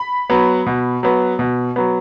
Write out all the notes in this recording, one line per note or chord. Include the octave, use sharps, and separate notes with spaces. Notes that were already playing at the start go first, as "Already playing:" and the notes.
Already playing: B5
F#3 B3
B2
F#3 B3
B2
F#3 B3